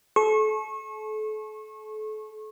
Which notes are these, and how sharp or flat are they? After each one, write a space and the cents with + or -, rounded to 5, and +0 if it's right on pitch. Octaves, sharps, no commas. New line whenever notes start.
A4 -35 C#6 -30